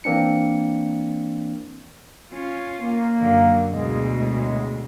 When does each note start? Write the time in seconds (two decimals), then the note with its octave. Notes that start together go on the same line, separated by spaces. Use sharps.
0.04 E3 A#3 C4 D4 C#7
2.32 C#4 F4
2.80 A#3
3.17 F#2 D3
3.72 D2 B2 G#3
4.16 A2 G#3